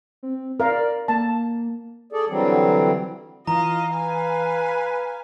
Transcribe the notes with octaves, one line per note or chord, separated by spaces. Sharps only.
C4
A#4 D5 F5
A#3 A5
G#4 A4 D5
D3 E3 F#3 G3 C4
E3 F4 D#5 F5 A#5
B4 F5 G#5